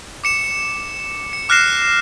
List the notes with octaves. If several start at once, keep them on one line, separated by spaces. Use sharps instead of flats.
D6 C#7 E7
C#7
D6 F6 F#6 A#6 C7 E7